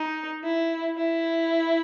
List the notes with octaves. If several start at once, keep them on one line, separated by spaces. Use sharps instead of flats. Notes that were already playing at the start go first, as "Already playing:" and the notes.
Already playing: D#4
E4
E4